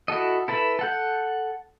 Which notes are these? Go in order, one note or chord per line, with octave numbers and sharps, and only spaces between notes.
E4 F#4 A4 D#5
E4 A4 B4 E5 B5
A4 F#5 G6